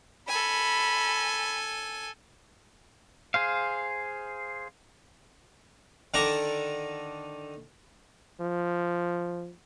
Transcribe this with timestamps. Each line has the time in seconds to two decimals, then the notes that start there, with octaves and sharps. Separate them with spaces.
0.28 A4 G#5 B5
3.34 G#4 C5 F5
6.14 D3 D#3 D5 A#5 C#6
8.41 F3